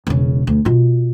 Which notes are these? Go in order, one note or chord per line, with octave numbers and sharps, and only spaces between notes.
E1 C#3
D2
B2 F4